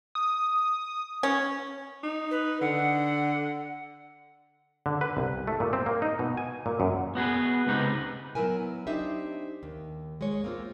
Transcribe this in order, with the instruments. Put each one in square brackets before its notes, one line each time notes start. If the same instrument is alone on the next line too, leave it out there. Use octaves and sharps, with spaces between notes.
[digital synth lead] D#6
[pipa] C#4
[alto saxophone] D#4
[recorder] B4
[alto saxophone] D3 [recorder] F#5
[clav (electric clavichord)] D3
B4
C2
A3
A#2
C4
A#3
D#4
B2
G#5
A#2
F#2
[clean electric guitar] B3 F#4 G#4 B4
C#2 C3 D#4 B4
[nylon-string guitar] F#3 B3 E4 A#4 G#5
C4 D4 D#4 G4 E5
D#2
G#3 C#5
A#3 C4 F4